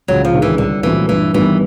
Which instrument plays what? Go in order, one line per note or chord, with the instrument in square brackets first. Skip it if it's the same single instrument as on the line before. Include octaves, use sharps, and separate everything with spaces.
[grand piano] C#2 [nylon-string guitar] F#3
[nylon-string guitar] F3
[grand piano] C3 D#3 G#3
[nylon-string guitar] E3
[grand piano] C2 [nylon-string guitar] D3
[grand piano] A#2 F#3 A3 C4 [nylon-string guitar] E3
[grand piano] G2 [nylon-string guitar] E3
[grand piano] D#3 G3 B3 [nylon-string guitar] E3